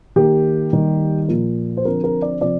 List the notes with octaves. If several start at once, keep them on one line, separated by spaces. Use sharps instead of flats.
D#3 A#3 G4
D#3 G3 A#3
A#2 F3 A#3
C5
D3 F3 C4 A#4
A#4
D5
C3 F3 C4 D5